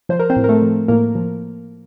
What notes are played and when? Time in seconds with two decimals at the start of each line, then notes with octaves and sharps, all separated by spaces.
0.09 F3 C5
0.19 A#4
0.30 C4 C5
0.36 A2
0.44 A#4
0.49 A3 A4
0.62 F3
0.88 A2 A#3 A#4
1.15 F3